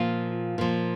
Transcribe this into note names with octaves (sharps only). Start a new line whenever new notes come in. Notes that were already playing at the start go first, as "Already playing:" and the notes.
Already playing: A#2 F3 F4
A#2 F3